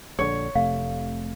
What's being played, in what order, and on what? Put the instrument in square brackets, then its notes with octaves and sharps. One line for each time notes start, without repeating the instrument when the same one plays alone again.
[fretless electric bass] A#1 D3 [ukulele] C#5
[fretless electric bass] F1 C3 A3 [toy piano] F5